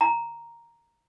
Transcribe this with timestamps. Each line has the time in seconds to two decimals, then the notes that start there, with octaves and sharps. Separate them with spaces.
0.01 A#5